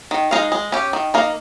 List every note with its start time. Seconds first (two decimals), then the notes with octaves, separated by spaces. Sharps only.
0.11 D#3
0.31 G#3 D#4 A#4 F5
0.52 G#3
0.72 C#4 G4
0.93 D#3
1.14 A#3 D#4 A#4 F5